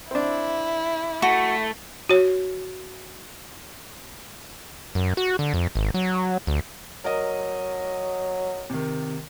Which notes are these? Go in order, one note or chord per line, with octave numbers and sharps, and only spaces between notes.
C4 D4 E4
A3 F#4
F#4 C#5
F#2
F#4
D3
F2
G#1
F#3
D2
F#3 A#4 D#5
C3 D#3